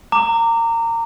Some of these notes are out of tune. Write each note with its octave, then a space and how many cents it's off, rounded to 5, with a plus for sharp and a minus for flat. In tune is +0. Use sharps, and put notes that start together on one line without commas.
A#5 -25 D6 +0